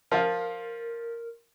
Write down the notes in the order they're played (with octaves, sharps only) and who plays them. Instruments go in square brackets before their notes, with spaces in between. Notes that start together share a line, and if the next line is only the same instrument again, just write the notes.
[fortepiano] F3 F4 [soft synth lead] A#4